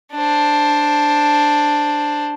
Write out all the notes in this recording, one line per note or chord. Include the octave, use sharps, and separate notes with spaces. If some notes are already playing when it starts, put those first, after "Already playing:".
D4 C5